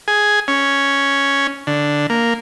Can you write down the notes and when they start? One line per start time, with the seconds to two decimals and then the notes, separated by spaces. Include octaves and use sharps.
0.08 G#4
0.48 C#4
1.67 D3
2.10 A#3